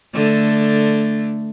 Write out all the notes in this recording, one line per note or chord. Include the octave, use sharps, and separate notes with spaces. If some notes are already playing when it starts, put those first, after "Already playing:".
D3 A3